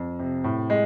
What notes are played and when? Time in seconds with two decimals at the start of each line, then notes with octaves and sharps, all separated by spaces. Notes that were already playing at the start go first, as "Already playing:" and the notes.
Already playing: F2
0.19 C3
0.44 A2
0.70 G#3